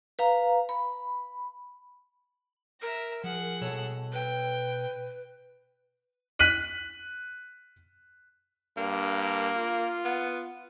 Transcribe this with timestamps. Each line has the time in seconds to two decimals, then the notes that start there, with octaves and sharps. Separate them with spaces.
0.19 B4 F5 A#5
0.69 B5
2.82 A#4 E5 A#5
3.24 F3 G#4 F#5
3.61 B2 A4 C#5
4.13 B4 G5
6.39 F#6 B6 D#7 F#7
8.77 G2 A#3
9.56 F4
10.05 B3